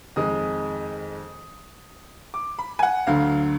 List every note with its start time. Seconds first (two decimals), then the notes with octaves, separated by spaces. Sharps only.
0.16 F2 D#3 G#3 D#6
2.34 D6
2.59 B5
2.79 G#5
2.83 F#5
3.07 D2 D3 F#3 F5